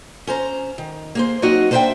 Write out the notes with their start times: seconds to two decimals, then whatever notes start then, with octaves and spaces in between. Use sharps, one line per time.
0.27 C#4 C5 A#5
0.78 D#3
1.15 A#3 G#4 C5
1.42 F#3 A#3 C4 D#4 F#4 D#5
1.71 A#3 D4 C5 D#5 E5 G5